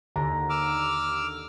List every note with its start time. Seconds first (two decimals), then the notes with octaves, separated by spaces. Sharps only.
0.16 D#2 D3 A#5
0.50 D6 E6 F6